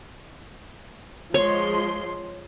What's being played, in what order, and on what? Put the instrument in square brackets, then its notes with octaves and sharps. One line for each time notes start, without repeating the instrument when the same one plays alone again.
[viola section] F3 G#3 C6 [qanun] C#5